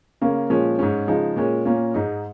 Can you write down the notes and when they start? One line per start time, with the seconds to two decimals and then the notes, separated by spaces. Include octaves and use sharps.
0.21 C#3 A#3 C#4
0.50 A#2 F3 G#3 C#4
0.79 G#2 G#3 C#4
1.07 C#3 F3 G#3 D#4
1.36 A#2 G#3 C#4
1.65 A#2 A#3 C#4
1.94 G#2 G#3 D#4